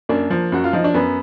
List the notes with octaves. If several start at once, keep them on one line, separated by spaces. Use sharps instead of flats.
F#2 A#3 D4
F3
F#2 F#4
F4
F3 D#4
D4
F#2 B3